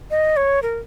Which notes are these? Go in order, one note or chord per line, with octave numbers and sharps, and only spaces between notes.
D#5
C#5
A#4